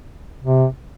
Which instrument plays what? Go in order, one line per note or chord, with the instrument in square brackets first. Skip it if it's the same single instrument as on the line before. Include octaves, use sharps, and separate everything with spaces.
[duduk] C3